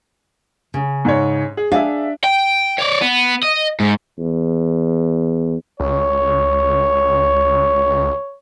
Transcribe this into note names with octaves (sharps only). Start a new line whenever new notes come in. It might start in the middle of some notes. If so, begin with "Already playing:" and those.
C#3
G#2 C#5
G#4
D4 G#4 E5 F5
G5
C#5 D5
B3
D#5
G#2
E2
C#2 C#5